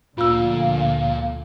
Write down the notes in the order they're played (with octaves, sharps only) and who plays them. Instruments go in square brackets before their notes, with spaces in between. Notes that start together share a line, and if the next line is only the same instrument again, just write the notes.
[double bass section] D2 D3 F3 [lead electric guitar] A#2 [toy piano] F4 E6 [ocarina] F5